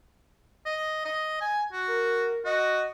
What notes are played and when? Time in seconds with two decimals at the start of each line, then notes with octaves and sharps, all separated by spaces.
0.66 D#5
1.05 D#5
1.41 G#5
1.73 F#4
1.88 A#4
2.45 F#4 D#5